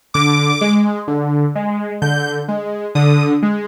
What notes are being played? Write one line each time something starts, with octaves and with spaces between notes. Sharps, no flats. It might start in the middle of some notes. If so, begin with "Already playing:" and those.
D3 D6
G#3
D3
G#3
D3 G6
G#3
D3 D#6
G#3